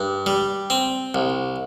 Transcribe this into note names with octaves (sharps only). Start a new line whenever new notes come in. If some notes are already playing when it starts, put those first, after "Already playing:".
Already playing: G2
G3
C4
C2